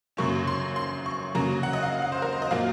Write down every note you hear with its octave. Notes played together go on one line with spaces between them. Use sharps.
F#2 C#3 F#3 A#3 C#4 C#6
C6
C6
C#6
C#3 F#3 A#3 A#5
F#5
D#5
F5
F5
C5
A#4
C5
D#5
A#2 F#3 A#3 F4 F5